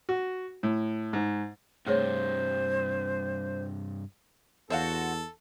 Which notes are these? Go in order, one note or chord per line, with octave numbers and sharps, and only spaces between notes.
F#4
A2
G#2
G2 C3 A3 G#4 C5 C#5
E2 F#4 A4 C5 C#5 E5 F5